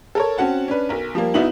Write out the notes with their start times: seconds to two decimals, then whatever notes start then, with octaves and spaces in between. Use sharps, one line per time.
0.15 A4 A#4 C#5
0.38 C4 C#4 F#4 F#5 A5
0.68 C#4 D4 B4
0.89 B1 A#4
1.15 F3 G3 A#3
1.34 C2 B3 D#4 E4 F#4 F#7